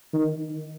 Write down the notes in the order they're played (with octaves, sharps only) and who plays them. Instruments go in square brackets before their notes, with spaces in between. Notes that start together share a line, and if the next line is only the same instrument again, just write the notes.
[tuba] D#3